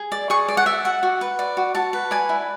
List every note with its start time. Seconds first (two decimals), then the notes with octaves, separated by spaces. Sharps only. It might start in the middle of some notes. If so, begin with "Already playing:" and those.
Already playing: G#4
0.12 D5
0.30 G#4 C#6
0.48 D5
0.57 F#5
0.66 D5 E5
0.85 F#4 F#5
1.03 F#4
1.21 B4
1.39 D5
1.57 F#4
1.75 F#4 A5
1.93 B4
2.11 D5 G#5
2.29 E4